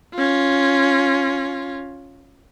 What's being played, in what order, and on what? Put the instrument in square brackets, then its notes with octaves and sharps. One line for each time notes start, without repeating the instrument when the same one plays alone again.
[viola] C#4 F4